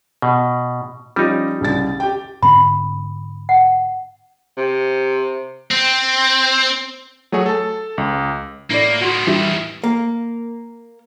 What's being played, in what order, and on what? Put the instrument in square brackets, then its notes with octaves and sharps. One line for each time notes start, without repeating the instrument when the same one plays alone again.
[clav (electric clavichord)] B2
[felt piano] F3 C#4 [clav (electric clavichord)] G3 D#4
[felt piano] C2 C#3 A6
G4 G5
[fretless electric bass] G#2 D3 C4 [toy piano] B5
[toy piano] F#5
[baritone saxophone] C3
[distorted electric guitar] C4
[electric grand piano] F#3 A3 F#4 G#4 C#5
A4 A5
C#2
[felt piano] A2 D5 [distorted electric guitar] A#3
[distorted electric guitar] A2 D#3 [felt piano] F#4 C6
[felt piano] E3 G3 E5
[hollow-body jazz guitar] A#3